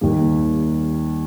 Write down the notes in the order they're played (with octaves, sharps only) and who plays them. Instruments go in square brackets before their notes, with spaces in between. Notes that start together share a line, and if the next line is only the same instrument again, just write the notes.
[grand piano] D#2 D#3 G3 A#3